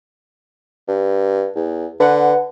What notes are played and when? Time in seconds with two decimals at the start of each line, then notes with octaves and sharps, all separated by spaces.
0.88 G2
1.55 E2
2.00 D3 B4 F#5